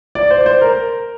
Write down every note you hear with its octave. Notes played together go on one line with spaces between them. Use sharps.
D5
C5
D5
C5
A#4